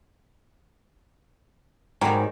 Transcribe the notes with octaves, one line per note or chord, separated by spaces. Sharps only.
G#2 D#3 F#3 G3